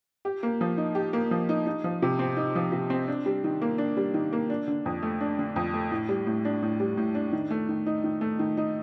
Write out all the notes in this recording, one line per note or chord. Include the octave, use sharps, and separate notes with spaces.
G4
A#3
F3
D#4
G4
A#3
F3
D#4
D#4
F3
C3
C4
D#4
F3
C3
C4
D4
G3
D#3
A#3
D4
G3
D#3
A#3
D4
D3
F2
A3
D4
D3
F2
A3
A2
G3
A2
D4
A2
G3
A2
D4
D#3
A3
D#3
D#4
D#3
A3
D#3
D#4